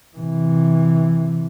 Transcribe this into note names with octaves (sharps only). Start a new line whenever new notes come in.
C3 E3